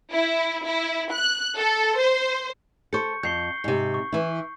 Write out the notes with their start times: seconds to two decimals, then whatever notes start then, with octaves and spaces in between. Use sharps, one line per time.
0.13 E4
0.64 E4
1.13 F#6
1.57 A4
1.97 C5
2.93 A4 C5 C#6 G6 C#7
3.23 F2 G6 C7 G7
3.64 G#2 C3
3.94 C#6
4.12 E3 E4